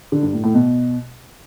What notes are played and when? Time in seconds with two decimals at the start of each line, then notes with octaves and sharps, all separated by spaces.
0.12 D3
0.23 G2
0.33 A2
0.44 A2
0.54 B2